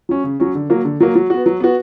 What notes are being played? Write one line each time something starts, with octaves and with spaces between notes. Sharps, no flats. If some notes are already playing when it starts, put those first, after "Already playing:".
F#3 C#4
C#3
F#3 C#4
D3
F#3 A#3
D3
F#3 A#3
F#3
B3 F#4
F#3
B3 F#4